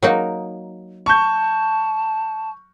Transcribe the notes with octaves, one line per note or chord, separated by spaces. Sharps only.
F#3 A#3 D#4
A5 C#6 G6